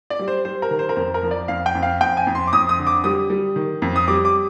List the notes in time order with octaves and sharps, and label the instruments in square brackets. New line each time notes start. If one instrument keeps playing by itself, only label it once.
[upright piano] D5
G3
C5
G3 C5
A#4
D#3
C5
A#4
F2 C5
A#4
F3
D5
F2 F5
G5
F2
F5
F2 G5
G#5
F2
C6
D6
F2 D#6
D#6
D3
D6
G3 D#6
G3
D#3
F2
D#6
G3 D6
D6